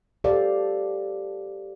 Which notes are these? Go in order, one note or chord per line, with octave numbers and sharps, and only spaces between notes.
G4 A4 C5 D5 F5